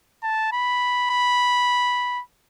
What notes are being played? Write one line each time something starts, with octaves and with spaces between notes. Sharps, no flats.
A5
B5
B5